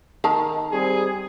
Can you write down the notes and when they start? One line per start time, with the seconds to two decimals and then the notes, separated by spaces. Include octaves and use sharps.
0.24 D#3 A#4 A5
0.71 G3 C4 G#4